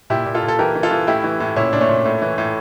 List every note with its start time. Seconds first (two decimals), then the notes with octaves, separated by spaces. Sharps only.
0.10 A#2 E4 G4
0.26 A#2
0.35 F4 A4
0.43 A#2
0.48 A4
0.59 E3 G4 A#4
0.75 E3
0.83 F4 A4
0.91 E3
1.07 A2 E4 G4
1.24 E3
1.40 A2
1.56 A#2 C#4 E4
1.73 A#2 D4
1.81 A3 C#4
1.89 A#2
2.06 A2
2.22 E3
2.38 A2